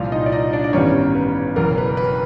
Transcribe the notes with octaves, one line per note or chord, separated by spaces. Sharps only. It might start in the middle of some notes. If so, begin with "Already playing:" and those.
Already playing: C2 A#2 F3 F4 F5
D#4 D#5
D5
D#4 D#5
D4 D5
D5
A1 G2 D#3 G3 B3 C#4 C#5
B4
F#1 E2 B2 F#3 A#4
B4
B4